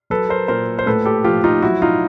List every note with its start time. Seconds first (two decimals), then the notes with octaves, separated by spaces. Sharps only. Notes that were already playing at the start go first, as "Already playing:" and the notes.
0.10 F#3 A4 B4
0.29 A#4 C5
0.48 A#2 A#4 C5
0.79 C5
0.86 A2 A4 B4
1.05 G4 A4
1.24 F3 F4 G4
1.44 D#4 F4
1.62 F#3 E4 F#4
1.82 D#4 F4